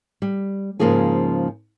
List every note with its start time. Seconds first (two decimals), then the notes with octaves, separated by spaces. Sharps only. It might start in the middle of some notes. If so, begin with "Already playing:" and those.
0.22 G3
0.79 G#2 C#3 F3 A#3 G#4 G#5